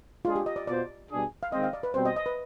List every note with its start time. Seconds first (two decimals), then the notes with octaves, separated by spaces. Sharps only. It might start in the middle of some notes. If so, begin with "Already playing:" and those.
0.24 G#3 D4 F4 G#4
0.36 G4
0.46 D#5
0.56 D5
0.67 B2 B3 F4 C5 D5
1.10 B2 G3 D4 G#4
1.43 F5
1.52 D#3 G#3 C4 D#5
1.63 F5
1.73 D5
1.83 B4
1.94 B2 G3 C4 C5
2.05 D#5
2.16 D#5
2.26 B4